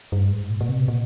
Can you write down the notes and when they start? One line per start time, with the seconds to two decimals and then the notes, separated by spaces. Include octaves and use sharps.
0.12 G2
0.31 G#2
0.50 A#2
0.61 A#2
0.69 C3
0.88 A#2